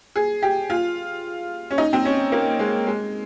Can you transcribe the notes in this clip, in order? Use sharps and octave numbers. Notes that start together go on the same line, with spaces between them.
G#4
G4
F4
C#4
D#4
C4
C#4
A#3
G#3
G#3